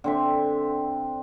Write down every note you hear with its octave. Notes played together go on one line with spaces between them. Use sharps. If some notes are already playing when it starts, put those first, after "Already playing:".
D3 C4 E5